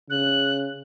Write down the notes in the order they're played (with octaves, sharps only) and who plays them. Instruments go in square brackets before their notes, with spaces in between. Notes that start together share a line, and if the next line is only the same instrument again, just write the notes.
[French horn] C#3 [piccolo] F#6